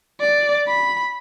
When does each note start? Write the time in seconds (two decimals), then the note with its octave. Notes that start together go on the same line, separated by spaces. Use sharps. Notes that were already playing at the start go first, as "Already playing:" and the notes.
0.20 D5
0.67 B5